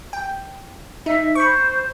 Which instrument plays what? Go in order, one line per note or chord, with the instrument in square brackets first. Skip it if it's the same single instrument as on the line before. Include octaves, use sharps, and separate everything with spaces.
[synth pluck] G5
[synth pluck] D#4 [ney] E5
[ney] C5 [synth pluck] B5 C#6